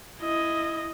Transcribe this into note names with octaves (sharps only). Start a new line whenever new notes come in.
E4 D#5